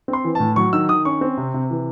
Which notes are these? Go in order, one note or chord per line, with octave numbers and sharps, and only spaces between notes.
C4
C6
E3
A2 A5
F#3 C#6
D#3 E6
D#3 D#6
C#4 C#6
C4
C3
C3
E3